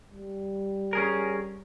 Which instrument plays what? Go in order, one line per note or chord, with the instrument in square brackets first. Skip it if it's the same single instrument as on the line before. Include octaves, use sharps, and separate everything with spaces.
[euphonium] G3
[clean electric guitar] C#4 G#4 A#4